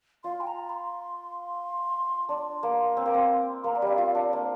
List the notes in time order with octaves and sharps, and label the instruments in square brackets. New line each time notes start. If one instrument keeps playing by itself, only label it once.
[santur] F4 [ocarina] C6
[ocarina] G5
A#5
C6
[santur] D4 [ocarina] C6
[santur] A#3
C4
A#3
C4
[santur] A#3 [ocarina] A#5
[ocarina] D5
[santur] G3
[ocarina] F5
[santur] F4
[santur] D4 [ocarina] D5
[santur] A#3 [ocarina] C5